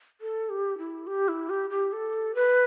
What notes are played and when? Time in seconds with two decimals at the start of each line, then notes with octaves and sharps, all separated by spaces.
0.21 A4
0.50 G4
0.78 E4
1.07 G4
1.28 E4
1.50 G4
1.70 G4
1.93 A4
2.35 B4